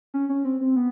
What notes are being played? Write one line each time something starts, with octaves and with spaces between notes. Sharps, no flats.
C#4
C#4
C4
C4
B3